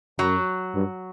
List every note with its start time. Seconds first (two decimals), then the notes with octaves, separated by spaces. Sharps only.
0.19 F#2 F#3
0.75 G2